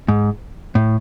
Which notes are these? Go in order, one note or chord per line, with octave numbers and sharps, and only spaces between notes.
G#2
A2